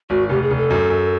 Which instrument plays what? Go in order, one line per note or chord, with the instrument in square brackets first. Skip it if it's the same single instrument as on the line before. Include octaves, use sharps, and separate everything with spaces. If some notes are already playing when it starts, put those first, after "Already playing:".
[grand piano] G#1 [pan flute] F#4
[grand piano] F1 [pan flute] G4
[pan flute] G#4
[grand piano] F1
[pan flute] A4
[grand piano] F#2
F#2